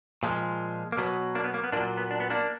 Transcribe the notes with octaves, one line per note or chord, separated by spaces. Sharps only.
A#2 F3 G#3
A#3
B2 F#3 B3
A#3 D4
B3
A#3
B3
A#2 F#3 A#3 D4
B3
D4
B3
A#3 D4